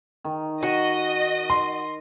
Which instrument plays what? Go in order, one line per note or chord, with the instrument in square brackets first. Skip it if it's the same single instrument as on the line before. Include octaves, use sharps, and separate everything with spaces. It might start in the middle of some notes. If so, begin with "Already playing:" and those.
[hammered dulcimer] D#3
[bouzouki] F#4 [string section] D#5
[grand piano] C6